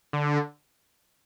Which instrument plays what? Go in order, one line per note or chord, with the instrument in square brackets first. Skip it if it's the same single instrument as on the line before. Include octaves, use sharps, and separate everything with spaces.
[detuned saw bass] D3